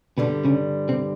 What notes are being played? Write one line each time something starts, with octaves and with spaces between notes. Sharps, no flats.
G2 B2 D3 G3 B3
C#3 C#4
C3 C4